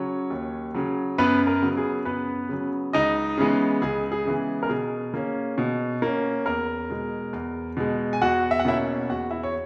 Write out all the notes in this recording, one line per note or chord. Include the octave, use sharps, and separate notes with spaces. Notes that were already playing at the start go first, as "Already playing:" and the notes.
Already playing: C#3 F#3 C#4 C#5
D#2
C#3 F#3
F#2 B3 B4
A#4
C#3 F#3 B3
G#4
F#2 B3 B4
C#3 F#3 B3
C#2 D#4 D#5
C#3 E3 G#3 B3
C#2 G#4
G#4
C#3 E3 G#3 B3
A#4
B2 G#4
A#3 C#4
B2
A#3 C#4
E2 A#4
B2 G#3
E2
B2 G#3
G#5
E2 F#4 F#5
E5
F#5
B2 A#3 C#4 E4 E5
E2 F#4 F#5
E4 E5
C#5